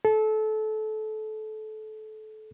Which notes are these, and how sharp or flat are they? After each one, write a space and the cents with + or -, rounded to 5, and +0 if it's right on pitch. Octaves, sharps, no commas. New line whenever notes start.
A4 -25